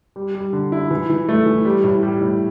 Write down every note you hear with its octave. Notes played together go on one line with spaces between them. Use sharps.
G3
G3
D3
E4
E3
E3
A3
E3
G3
A2
G3
A2